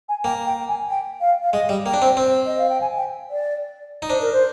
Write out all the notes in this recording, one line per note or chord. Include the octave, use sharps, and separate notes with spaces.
G#5
A#3 G5
G5
G#5
G5
F5
F5
G#3 D#5
G3
A#3 G5
D4
C4
C4
D#5
F5
G5
G#5
G5
D5
D#4
D4 C5
A#4
C5